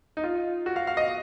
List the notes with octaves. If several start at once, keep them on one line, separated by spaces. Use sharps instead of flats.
D#4
F4
F#4
F5
F5
D#5